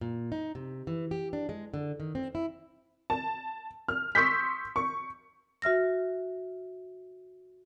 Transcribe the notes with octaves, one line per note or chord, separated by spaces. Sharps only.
A#2
D#4
C3
E3
G4
D4
G#3
D3
D#3
C4
E4
A5
F6
C6 C#6 D#6 E6 G6 B6
C#6
F#4 E5 F6 A#6